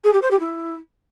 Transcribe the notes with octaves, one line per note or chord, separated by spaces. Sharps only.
G#4
G4
C5
G4
E4